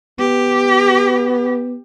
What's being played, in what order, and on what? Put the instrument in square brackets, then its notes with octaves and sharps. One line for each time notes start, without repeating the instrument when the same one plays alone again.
[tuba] B3 [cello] G4